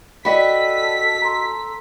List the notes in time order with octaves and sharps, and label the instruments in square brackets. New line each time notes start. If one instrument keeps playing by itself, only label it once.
[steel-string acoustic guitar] F#4 D#5 [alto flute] A4 [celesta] D5 G5 B5 [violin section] B6
[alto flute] A4 [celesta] A#5 C6